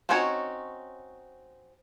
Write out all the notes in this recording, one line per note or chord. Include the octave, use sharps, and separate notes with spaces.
C4 C#4 D#4 F#4 C#5